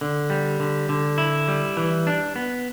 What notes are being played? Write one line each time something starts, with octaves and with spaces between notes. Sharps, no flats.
D3
G3
D3
D3
E4
G3
E3
D4
B3